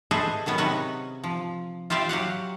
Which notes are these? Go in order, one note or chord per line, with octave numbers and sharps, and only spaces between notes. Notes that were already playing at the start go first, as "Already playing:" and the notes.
G#4 A4 B4 C5 D#5 E5
D#3 F#3 B3 C#4
C3 C#4 D#4 B4 E5 F#5
F3
F4 G4 C5 D5 E5
F#3 G4 F5 F#5